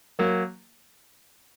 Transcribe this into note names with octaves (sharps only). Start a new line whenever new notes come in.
F#3 A#3